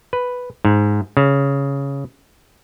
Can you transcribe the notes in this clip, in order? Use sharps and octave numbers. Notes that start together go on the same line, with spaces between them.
B4
G#2
C#3